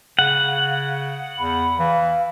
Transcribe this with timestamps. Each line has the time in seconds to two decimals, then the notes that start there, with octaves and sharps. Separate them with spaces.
0.19 C#3 F5 F#5
1.38 E2 B5
1.79 E3 F5